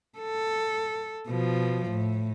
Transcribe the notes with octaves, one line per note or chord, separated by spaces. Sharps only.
A4
B2 F3
A2